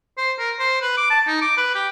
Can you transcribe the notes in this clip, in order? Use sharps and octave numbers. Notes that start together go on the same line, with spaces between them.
C5
A#4
C5
B4
D6
A5
D#4
D6
B4
G4